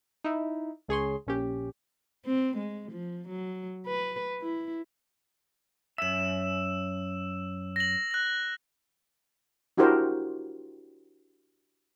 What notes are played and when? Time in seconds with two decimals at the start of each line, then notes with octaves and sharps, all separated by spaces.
0.24 D#4 E4
0.88 C#2 G#4 C#5 C6
1.27 A#1 C#4 G4
2.26 C4
2.57 G#3
2.91 F3
3.29 F#3
3.87 B4
4.41 E4
5.98 F#2 E5 E6 E7
7.76 A#6 F#7
8.11 F#6 A#6
9.77 D4 E4 F#4 G4 A#4 C5